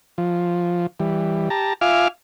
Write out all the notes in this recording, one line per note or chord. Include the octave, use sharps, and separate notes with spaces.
F3
E3 G3
G4 A5 A#5
F4 E5 F5 G#5 D6 F6